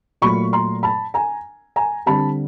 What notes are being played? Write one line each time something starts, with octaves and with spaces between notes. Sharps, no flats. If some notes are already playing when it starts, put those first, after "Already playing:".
A#2 F#3 A3 B5 C#6
A#5 C6
A5 B5
G#5 A#5
G#5 A#5
D3 G3 C4 A5 B5